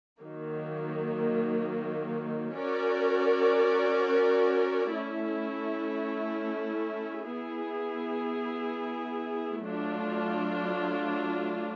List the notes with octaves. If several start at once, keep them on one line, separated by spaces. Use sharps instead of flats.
D#3 F#3 A#3 D#4
C#4 F#4 A#4 D5
A3 C#4 E4
B3 E4 G#4
F#3 A3 D4 F4